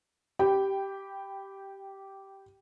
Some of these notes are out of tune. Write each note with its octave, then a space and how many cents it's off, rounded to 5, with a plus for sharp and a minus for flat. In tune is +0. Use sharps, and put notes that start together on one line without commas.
G4 -10 G5 +0 B5 +10